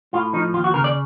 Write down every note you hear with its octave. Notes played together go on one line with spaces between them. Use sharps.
A2 F4
F3 D#4
D#2 F4
F#4
C#3 A#4
D5